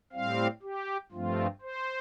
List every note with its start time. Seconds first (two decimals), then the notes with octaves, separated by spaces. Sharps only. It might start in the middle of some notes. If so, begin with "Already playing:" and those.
0.13 A2 G3 C4 F5
0.62 G4
1.12 G2 F3 A3 C4 F4
1.62 C5